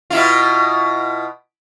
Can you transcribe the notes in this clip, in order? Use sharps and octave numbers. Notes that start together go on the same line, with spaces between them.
B2 E4 F4